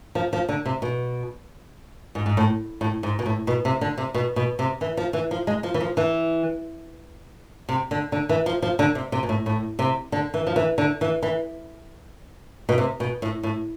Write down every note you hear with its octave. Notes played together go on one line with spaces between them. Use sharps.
F3
F3
D3
C3
B2
G#2
G#2
A2
A2
G#2
B2
A2
B2
C3
D3
C3
B2
B2
C3
E3
F3
E3
F3
G#3
F3
E3
F3
E3
C3
D3
D3
E3
F3
F3
D3
C3
C3
B2
A2
A2
C3
D3
E3
F3
E3
D3
E3
E3
B2
C3
B2
A2
A2